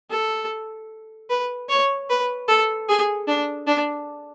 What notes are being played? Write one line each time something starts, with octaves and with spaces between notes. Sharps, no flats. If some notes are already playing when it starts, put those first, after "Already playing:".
A4
B4
C#5
B4
A4
G#4
D4
D4